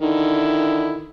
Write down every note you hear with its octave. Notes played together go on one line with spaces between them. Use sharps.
D3 D#3 E4